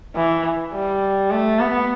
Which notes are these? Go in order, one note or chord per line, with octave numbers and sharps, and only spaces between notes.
E3
G3
A3
B3